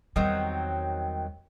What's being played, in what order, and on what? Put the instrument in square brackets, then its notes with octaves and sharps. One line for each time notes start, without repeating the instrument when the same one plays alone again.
[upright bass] E2 G3 [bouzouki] D#3 F#3 C4